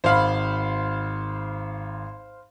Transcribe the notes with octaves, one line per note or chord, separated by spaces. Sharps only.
G#1 C5 F5 B5